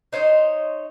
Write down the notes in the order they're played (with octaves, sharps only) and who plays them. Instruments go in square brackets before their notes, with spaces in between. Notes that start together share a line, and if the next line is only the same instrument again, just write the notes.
[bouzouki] D#4 C5 C#5 D#5